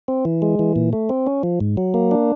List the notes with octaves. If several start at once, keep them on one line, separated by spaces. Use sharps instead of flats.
C4
E3
G#3
E3
A#2
A3
C4
C#4
F3
G#2
F#3
A#3
D4